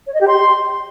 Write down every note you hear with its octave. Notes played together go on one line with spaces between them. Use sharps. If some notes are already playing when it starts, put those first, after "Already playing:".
C#5
D#5
G4
C6